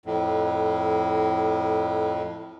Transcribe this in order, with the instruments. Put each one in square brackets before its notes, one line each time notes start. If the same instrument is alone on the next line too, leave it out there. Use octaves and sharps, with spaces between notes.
[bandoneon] F2 A2